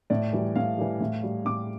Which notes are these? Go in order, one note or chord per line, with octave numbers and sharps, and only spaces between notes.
A2 D5
E3 G3
A2 F5
E3 G3
A2
G3
A2 D6